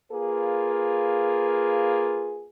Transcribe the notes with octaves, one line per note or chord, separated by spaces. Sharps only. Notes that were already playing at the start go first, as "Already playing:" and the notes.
A#3 F4 G#4 B4